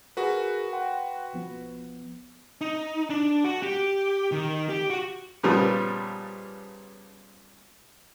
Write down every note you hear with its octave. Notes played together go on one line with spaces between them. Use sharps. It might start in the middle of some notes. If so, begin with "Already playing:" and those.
F#4 G#4 A#4 B4
F#5 G5 C6
B1 F3 B3
D#4
D4
F#4
G4
D#3
G4
F#4
A#2 C#3 F3 G3 B3